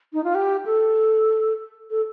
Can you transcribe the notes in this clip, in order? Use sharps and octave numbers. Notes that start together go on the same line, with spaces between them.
D#4
F4
G4
A4
A4